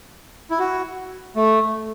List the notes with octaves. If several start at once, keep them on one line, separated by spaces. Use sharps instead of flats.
E4
F#4
A3